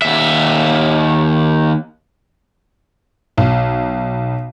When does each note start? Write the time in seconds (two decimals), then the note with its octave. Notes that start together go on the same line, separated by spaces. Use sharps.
0.02 D#2 E5
3.38 B1